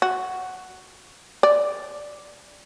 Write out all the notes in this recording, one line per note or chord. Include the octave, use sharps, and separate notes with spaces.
F#4
D5